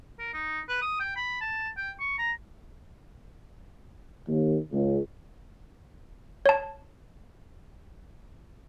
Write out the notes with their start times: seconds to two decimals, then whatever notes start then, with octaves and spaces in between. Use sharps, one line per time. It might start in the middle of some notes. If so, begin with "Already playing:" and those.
0.19 A#4
0.34 D#4
0.69 B4
0.82 D#6
1.00 G5
1.16 B5
1.41 A5
1.77 G5
2.00 C#6
2.18 A#5
4.28 D#2
4.71 C#2
6.46 C#5 A5